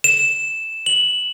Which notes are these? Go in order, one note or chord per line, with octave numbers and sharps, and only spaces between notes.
E7
F#7